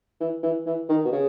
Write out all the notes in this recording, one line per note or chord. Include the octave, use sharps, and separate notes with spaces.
E3
E3
E3
D#3
B2
C#3